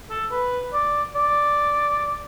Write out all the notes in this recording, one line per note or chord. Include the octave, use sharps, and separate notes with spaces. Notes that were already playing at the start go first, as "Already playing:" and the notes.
A4
B4
D5
D5